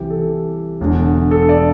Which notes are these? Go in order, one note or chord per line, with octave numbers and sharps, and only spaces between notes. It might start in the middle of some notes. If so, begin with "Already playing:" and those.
Already playing: C2 C3 E3 G4
A4
E1 E2 D3
A4
D5